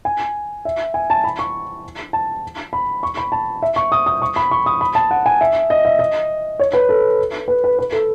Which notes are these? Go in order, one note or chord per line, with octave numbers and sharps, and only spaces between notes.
G#5
E5
G#5
A5
B5
C#6
A5
B5
C#6
B5
A5
E5
C#6
D#6
D#6
C#6
B5
C#6
D#6
B5
A5
F#5
G#5
E5
D#5
E5
D#5
C#5
B4
A4
B4
B4
B4
A4